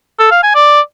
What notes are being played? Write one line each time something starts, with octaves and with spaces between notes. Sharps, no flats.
A4
F5
G#5
D5